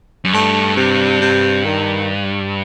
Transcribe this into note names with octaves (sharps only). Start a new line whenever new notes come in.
F#2
G2 A3
C3
C3
D#3